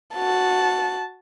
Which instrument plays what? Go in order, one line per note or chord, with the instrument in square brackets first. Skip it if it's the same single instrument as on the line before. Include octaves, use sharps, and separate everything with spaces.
[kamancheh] F#4 A5